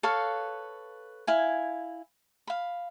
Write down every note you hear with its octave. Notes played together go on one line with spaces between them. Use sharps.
A4 B4 C#5 F5
E4 F5 G#5
F5 B5